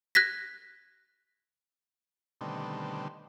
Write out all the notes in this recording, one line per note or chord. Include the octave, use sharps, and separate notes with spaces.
F#6 G#6 A#6 B6
B2 D3 D#3 G3 A3 C4